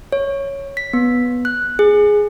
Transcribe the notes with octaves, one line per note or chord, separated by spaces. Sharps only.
C#5
B6
B3
F#6
G#4